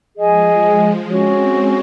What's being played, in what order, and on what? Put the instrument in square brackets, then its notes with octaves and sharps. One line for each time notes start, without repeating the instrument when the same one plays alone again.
[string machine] F3 G#3 [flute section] G#4 D#5 G#5
[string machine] F3 G#3
[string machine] G#3 C4 [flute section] C#4 F#4 C#5